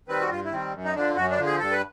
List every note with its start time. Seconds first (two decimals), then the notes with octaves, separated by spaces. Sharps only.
0.08 D#3 G3 C4 B4
0.21 F#4
0.30 G2 F4
0.45 E4
0.52 D#3 G3 C4
0.73 F#2
0.84 D#4
0.95 D3 F3 D4
1.16 F#2 F#4
1.30 D4
1.38 D3 F3
1.46 G#4
1.59 G2 A4
1.72 B4